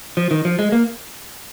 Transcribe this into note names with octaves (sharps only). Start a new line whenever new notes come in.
F3
D#3
F3
G#3
A#3